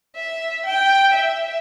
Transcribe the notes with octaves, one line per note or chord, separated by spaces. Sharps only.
E5
G5
E5